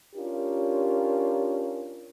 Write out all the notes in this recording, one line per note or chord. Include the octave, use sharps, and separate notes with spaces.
C#4 D4 F4 G4 A#4